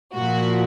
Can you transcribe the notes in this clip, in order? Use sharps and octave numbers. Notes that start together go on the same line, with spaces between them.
A#2 F3 F#4